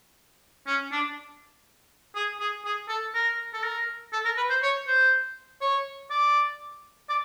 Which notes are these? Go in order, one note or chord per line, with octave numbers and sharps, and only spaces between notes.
C#4
D4
G#4
G#4
G#4
A4
A#4
A4
A#4
A4
A#4
B4
C5
C#5
C5
C#5
D5
D5